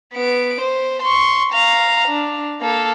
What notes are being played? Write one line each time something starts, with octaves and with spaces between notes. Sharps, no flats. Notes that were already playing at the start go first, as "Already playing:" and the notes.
B3 D7
C5
C6 C#6
F5 A#5
D4
A#3 A4